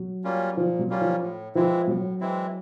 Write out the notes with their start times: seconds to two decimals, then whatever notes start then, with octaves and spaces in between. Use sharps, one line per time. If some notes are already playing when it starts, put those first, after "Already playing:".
Already playing: F#3
0.24 G3 A#3 C#4 F4
0.57 A#2 F3
0.79 F#3
0.90 G3 A#3 C#4 F4
1.01 F3
1.22 A2
1.55 E3 F3 G#3 C4 E4
1.88 A2 F#3
2.20 E3 G#3 C4 E4